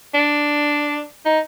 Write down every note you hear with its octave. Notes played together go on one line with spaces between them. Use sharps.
D4
D#4